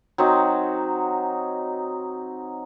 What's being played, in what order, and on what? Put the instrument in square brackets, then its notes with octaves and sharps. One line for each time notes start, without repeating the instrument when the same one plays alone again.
[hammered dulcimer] F#3 C4 D#4